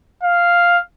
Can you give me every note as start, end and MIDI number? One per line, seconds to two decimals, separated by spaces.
0.23 0.79 77